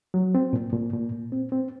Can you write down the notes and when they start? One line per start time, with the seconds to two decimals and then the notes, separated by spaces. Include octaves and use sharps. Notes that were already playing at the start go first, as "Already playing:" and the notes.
0.14 F#3
0.35 C4
0.53 A#2
0.73 A#2
0.93 A#2
1.12 A#2
1.32 C4
1.52 C4